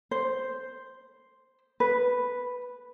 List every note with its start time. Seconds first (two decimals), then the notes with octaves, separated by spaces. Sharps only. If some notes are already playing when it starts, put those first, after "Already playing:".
0.11 C5
1.80 B4